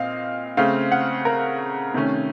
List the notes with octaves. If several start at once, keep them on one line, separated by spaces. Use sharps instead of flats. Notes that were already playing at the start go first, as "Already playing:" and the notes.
Already playing: A#2 C4 D#5 F5
C#3 A3 C4 F5
F#5
A#4
C3 D#3 A3 C#4